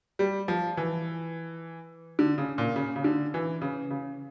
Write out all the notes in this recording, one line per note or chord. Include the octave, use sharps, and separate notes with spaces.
G3
F3
E3
D3
C#3
A#2
C#3
C#3
D3
E3
C#3
C#3